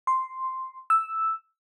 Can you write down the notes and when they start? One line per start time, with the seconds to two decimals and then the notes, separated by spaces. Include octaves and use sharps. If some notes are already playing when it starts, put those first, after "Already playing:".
0.07 C6
0.90 E6